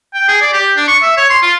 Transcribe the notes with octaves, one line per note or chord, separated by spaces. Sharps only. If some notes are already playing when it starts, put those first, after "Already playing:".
G5
G#4
D5
G4
D4
C#6
E5
C#5
C6
F4